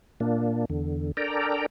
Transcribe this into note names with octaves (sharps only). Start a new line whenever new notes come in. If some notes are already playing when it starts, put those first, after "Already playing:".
A#2 A#3 D4
E2 D3
D4 A4 A#4 D5 G5 A#5